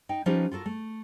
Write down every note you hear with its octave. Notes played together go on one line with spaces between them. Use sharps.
D#4 G5
F3 C#4 D#4 F4 G4 B4
F4 F#4 A4 A#4
A3